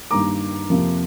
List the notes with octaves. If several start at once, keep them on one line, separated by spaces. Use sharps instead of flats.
G2 D#3 A#3 A#5 D6
F2 C3 F3 A#3